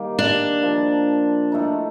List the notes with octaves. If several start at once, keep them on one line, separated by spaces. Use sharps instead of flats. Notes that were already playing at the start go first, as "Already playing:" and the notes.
Already playing: D#3 G3 A#3
D4
A#2 F3 A#3
A2 A3 D#4